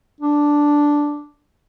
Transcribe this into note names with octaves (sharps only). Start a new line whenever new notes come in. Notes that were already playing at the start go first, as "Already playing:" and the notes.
D4